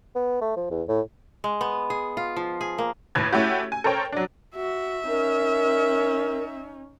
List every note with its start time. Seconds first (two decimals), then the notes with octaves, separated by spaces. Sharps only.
0.15 B3
0.41 A3
0.57 F3
0.71 E2
0.89 A2
1.44 G#3
1.61 B3
1.90 G#4
2.17 F4
2.36 F3
2.61 G#4
2.78 A#3
3.15 D#2 A2 B4 G#6
3.32 A3 C#4 E4 F#4 G4
3.72 G#5
3.84 A4 A#4 C5 C#5 G5
4.12 F#3 D4
4.56 F#4 E5
5.08 C#4 D#4 A#4